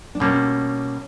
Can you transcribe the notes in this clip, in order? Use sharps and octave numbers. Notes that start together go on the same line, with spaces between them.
D4
B2 G3 A#3 C#4